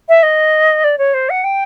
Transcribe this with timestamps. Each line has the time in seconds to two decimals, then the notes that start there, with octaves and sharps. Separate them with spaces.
0.08 E5
0.23 D#5
0.84 D5
0.98 C#5
1.14 C5
1.29 F#5
1.44 G5